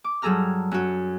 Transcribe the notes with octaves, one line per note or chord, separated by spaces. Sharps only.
D6
G2 F#3 G#4 A4 A#5 F6
F#2 F#4